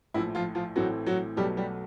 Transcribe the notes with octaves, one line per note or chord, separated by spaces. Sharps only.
A#1 A2 F3 E4
F3 F4
F3 F4
A1 A2 E3 F#3 A3 C4 F#4
F#3 F#4
B1 B2 F#3 G3 A3 G4
G3 G4